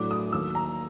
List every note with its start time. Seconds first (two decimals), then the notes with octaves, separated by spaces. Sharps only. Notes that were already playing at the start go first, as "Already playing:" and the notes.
Already playing: A2 F#3 A3 D4 D6
0.11 D#6
0.33 D#2 D#3 F#3 A#3 E6
0.55 A#5